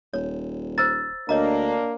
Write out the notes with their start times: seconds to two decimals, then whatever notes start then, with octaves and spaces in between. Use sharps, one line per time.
0.14 D#1 C#5
0.78 C5 A#5 E6 A6
1.29 D2 A#3 D4 C#5 D#5 A#5